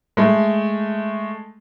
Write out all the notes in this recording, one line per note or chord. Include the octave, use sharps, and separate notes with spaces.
G#3 A3